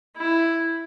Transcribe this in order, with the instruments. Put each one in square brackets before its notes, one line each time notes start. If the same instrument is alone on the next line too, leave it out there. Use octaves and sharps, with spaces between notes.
[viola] E4